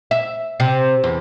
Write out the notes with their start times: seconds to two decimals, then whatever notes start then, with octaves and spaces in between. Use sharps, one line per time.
0.11 E5
0.60 C3
1.04 E2